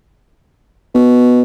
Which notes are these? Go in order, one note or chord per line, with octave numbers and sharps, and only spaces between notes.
B2